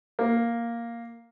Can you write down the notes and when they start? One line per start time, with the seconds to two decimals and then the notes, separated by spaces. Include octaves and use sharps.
0.19 A#3